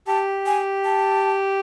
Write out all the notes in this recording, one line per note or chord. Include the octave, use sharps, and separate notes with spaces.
G4 A5
G#5
A5